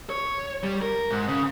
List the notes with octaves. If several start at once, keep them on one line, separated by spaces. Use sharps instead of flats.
C#5
G3
A#4
G#2
C#3